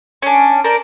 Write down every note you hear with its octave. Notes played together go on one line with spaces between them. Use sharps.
C#4 D4
A#4 C5 D5